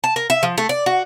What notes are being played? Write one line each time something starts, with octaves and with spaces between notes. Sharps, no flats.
A5
A#4
E5
F3
A3
D5
F#4